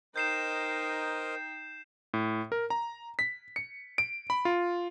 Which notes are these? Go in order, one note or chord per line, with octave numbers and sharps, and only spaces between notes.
D#4 A#4 C5 D#5 G5 G6 C7 E7
A2
A#4
A#5
B6
C#7
D7
B5
F4